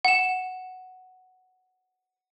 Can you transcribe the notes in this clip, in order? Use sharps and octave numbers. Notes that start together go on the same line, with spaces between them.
F#5 E7